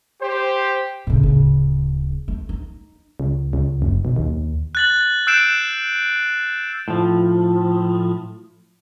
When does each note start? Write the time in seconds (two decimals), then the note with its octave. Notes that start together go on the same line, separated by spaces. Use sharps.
0.21 G4 C5
1.07 A2 C#3
1.23 D1 C#3
2.28 A3
2.49 D#4
3.20 C#2
3.53 C#2
3.82 F#1
4.05 B1
4.16 D#2
4.75 F#6 A6 F#7
5.27 E6 F#6 G6 C7 D7 E7
6.88 A2 F3